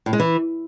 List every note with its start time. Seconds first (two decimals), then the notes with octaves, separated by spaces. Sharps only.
0.06 A2
0.13 G#3
0.20 E3